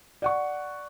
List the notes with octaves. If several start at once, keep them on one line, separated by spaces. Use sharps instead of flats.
D5 F#5 C#6